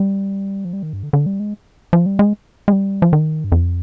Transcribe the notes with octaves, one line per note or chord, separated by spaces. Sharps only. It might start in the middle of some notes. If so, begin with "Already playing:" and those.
Already playing: G3
F3
G3
D#3
G2
D3
D3
G3
G#3
F3
G3
G#3
G#3
G3
F3
D#3
G2
F2